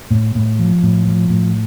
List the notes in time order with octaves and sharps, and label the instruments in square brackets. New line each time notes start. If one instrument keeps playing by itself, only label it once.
[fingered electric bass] A2
A2
F3
A2
F3
A2